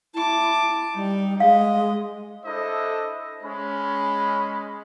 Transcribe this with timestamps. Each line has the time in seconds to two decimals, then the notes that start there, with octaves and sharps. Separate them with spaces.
0.15 E4 A5 D6
0.95 G3 D#4
1.40 G#3 D#5 F5
2.45 D4 E4 A4 C5 D#5 E5
3.43 G#3 C#4 B5